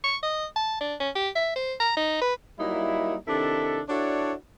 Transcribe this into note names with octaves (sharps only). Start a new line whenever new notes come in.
C#6
D#5
A5
D4
C#4
G4
E5
C5
A#5
D#4
B4
F#3 G3 A#3 D#4 E4
C3 D#3 D4 E4 A4
D4 E4 F#4 A4 C#5 D5